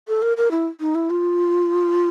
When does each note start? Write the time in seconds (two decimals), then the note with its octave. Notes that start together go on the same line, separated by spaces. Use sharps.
0.08 A4
0.22 A#4
0.37 A#4
0.51 E4
0.80 D#4
0.95 E4
1.10 F4